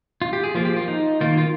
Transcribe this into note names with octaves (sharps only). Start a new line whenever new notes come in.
F4
G4
G#4
F3 A#3 F4
G4
F4
D#4
D#3 A#3 F4
F4